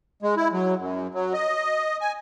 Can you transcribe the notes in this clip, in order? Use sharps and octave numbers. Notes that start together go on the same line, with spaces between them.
G#3
E4
F#3
F#2
F#3
D#5
G#5